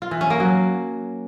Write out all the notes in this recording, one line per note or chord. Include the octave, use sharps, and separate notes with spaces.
F4
E3
C#4
A#3
F#3